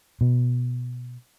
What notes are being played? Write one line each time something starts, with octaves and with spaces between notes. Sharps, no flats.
B2